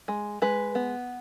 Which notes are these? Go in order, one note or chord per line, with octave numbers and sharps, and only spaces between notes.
G#3
G#3 B4
B3